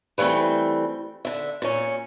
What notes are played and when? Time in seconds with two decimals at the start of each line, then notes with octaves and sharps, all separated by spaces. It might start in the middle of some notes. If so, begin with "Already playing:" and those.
0.18 E3 F#3 G3 A3 C4
1.25 D3 E5
1.62 A#2 C#4